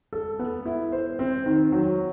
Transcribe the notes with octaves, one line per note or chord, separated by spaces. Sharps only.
A4
B3
E4
C5
C4
D#3
F#3